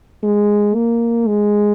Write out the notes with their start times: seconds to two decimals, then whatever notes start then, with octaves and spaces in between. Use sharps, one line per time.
0.23 G#3
0.75 A#3
1.27 G#3